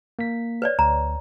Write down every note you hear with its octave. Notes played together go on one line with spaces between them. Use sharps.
A#3 B6
B4 C#5 D5
D2 A#5